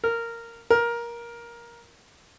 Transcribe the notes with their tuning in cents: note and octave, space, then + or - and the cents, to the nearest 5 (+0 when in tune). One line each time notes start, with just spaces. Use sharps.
A#4 -10
A#4 +15